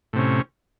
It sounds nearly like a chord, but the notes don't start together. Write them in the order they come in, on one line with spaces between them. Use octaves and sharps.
A2 C3 C#4